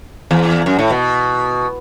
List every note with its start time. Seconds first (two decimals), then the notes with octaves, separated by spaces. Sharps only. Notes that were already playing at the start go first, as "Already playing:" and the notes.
0.31 E2
0.66 F#2
0.79 A2
0.91 B2